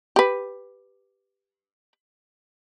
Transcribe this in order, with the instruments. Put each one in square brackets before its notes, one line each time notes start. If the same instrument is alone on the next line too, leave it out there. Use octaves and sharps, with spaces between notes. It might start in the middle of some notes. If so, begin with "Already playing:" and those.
[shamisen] G4 B4